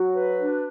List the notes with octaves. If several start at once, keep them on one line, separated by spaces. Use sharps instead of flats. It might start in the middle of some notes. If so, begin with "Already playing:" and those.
Already playing: F#3 F#4
B4
D4